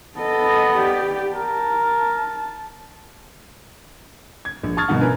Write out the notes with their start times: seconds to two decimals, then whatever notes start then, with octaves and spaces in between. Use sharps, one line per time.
0.18 B3 A4 D#5
0.77 G4 D5
1.34 A#4 A5
4.45 G#6
4.63 A#1
4.77 A5 C#6 D#6 F6 G#6 A6
4.88 G#1 G2 B2 D#4 F#5
5.01 C#4 E4 A#4 B4 G#5